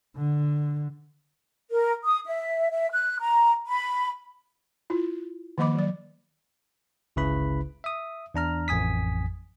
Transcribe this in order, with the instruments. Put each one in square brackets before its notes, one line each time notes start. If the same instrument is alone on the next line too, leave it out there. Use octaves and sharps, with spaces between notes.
[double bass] D3
[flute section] A#4
D#6
E5
E5
F#6
A#5
B5
[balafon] E4 F4
D#3 F3 A#3 D#5 B5 D6
F#3 D5
[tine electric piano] G1 C#2 C#3 E4 B4 B5
E5 D#6
E2 D4 A#5 F6
A1 F2 G#5 D#6 B6